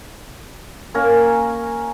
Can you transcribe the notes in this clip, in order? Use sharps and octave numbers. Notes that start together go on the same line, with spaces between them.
A#3 C#4 A#4 G#5